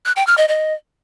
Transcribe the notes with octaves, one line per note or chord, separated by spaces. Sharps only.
F#6
G5
F6
D#5
D#5